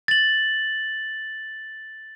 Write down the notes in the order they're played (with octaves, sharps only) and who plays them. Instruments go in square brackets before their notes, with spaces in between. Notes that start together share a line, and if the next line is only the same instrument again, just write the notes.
[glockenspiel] A6 F#7